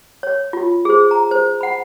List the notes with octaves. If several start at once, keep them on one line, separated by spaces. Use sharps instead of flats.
C#5
F4
G#4 C5
A#5
C5
F#5 B5